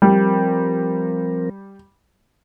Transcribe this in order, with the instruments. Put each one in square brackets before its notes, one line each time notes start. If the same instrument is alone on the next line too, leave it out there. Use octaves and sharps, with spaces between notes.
[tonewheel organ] F3 C4 A#4 [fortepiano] G3